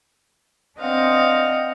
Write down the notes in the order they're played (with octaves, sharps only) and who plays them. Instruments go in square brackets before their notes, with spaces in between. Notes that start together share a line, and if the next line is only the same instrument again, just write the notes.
[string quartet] C4 D4 D#5 F5 F#5